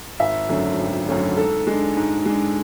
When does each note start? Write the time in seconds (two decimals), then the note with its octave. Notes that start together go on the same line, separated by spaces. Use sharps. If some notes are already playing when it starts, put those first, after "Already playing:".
0.20 G#1 E5
0.49 F#2 D3 A3 C#4
0.79 G#1
1.08 F#2 D3 A3 C#4
1.37 G#2 A4
1.67 G#3 D4
1.97 G#2
2.25 G#3 D4